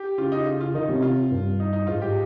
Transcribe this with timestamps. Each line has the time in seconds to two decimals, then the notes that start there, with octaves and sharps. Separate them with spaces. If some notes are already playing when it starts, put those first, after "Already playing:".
Already playing: G4
0.18 C#3 F4
0.32 D#4
0.47 F4
0.61 F4
0.74 D#3 D#4
0.89 C3 C#4
1.02 F4
1.31 G2
1.60 D#4
1.73 D#4
1.87 G#2 F4
2.02 G4